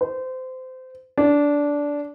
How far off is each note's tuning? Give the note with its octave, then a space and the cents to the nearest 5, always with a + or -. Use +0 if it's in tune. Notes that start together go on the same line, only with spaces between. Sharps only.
C5 -25
D4 -15